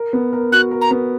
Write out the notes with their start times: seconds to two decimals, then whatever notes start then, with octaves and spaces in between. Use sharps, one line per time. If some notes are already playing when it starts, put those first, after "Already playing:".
Already playing: A#4
0.13 B3
0.33 A#4
0.52 F#4 F#6
0.71 A#4
0.81 A#5
0.91 B3